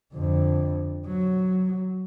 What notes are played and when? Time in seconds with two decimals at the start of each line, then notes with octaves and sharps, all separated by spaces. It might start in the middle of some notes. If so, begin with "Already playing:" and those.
0.13 F2 D3
1.06 F#3